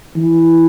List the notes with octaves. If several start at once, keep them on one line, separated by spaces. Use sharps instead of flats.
E3